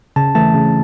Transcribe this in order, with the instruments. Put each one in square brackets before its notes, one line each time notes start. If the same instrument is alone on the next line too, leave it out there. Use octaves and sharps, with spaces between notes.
[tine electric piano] C#3 A5
E3 A3 A5
C#3